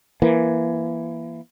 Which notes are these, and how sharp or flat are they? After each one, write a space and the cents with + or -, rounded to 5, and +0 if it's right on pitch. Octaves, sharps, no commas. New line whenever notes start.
E3 +20 A#3 +30